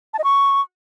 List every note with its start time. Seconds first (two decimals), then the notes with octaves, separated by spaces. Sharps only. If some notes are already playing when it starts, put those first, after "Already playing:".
0.14 A5
0.19 D#5
0.24 C#6